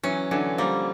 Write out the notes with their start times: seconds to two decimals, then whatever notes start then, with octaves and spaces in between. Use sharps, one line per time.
0.04 E3 F#3 C#4
0.31 D3 E3 F#3
0.58 F3 G3 A#3